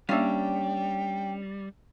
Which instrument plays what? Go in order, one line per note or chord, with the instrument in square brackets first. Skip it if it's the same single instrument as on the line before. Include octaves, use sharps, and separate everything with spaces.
[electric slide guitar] G3 [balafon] A#3 F5 [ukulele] C#4 D4 [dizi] G5